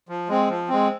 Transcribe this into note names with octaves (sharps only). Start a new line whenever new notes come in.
F3
G#3 C4
F3
G#3 C4